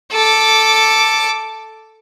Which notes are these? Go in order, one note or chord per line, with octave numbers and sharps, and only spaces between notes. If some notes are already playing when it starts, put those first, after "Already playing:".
A4 D6